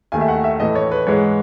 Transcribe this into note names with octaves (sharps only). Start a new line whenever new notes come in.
D#2 D#3 A3 G#5
E5
F#5
E5
A2 E3 A3 D#5
C#5
B4
G#2 E3 G#3 C#5